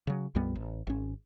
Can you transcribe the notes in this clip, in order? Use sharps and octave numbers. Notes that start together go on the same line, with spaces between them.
C#3 F#3
A#1 F2 G3 B3
A1
G#1 C#4